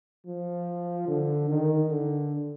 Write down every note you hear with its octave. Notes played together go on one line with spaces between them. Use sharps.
F3
D3
D#3
D3